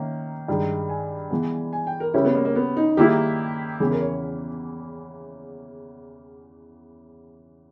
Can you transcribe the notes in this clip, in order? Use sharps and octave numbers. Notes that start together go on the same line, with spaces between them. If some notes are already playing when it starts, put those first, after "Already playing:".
Already playing: D#3 A#3 C#4 E5
G2 D#3 G#3
G#5
E3 G#3 B3
G#5
G5
A#4
C#3 G3 C#4 E4 G4
B3
A#3
A#3
B3
D#4
D#3 G3 A#3 E4 G4 G#4
E2 C#3 E3 G#4
A#4
C#5